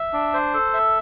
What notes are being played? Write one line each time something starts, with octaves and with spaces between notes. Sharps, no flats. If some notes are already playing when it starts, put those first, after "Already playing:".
Already playing: E5
D4
C5
A4
E5